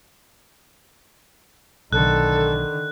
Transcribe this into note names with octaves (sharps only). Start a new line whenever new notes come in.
B1 D3 D#3 A4 F#6